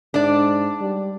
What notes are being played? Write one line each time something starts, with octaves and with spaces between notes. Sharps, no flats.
G#2 D4 D5
G3